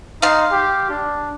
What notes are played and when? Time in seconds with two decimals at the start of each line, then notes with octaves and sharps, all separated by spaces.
0.22 D#4 F5 C6
0.51 G4
0.90 D4